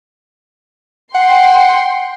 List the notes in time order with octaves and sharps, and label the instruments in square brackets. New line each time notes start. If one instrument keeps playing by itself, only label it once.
[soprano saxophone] F#5 [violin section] G5 C6